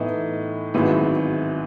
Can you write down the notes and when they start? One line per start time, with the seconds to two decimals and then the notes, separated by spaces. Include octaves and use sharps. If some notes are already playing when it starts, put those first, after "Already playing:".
Already playing: A2 E3 B3 D#4
0.74 G#1 G#2 F#3 B3 E4